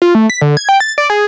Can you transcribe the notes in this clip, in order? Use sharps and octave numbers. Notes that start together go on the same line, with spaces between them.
F4
A3
B6
D3
G#6
G5
A6
D5
G#4